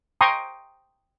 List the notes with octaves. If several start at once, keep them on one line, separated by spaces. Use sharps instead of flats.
G5 A#5 C6 C#6 D#6